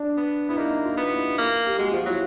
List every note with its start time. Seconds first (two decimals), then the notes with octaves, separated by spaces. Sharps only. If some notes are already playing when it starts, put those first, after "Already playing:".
Already playing: D4
0.17 B3
0.49 B3 E4
0.57 A#3 D#4
0.85 F4
0.97 B3
1.06 D#4
1.12 E4
1.38 A#3
1.66 G4
1.79 G#3 F#4
1.92 F3 F4
2.06 F#3 E4